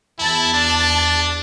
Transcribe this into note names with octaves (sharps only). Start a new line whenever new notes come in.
E2 E4 A5 A6
D4